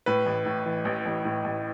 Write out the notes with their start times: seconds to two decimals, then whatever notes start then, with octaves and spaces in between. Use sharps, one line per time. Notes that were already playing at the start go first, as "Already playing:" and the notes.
0.06 A2 B4
0.26 A1
0.46 A2
0.66 E3
0.85 A1
1.05 A1
1.25 A2
1.44 A1